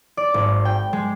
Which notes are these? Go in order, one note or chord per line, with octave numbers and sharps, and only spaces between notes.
D5
G#1
G5
G#3